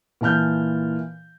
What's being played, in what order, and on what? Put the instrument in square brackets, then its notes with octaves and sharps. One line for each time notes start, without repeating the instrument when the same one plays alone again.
[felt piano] A#2 E3 A5 F6 G6